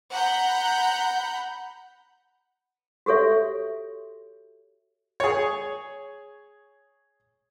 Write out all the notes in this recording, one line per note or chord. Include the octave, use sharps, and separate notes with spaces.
F#5 A#5 B5 F#6 G6
F#4 G4 A4 C#5 E5
G#4 C#5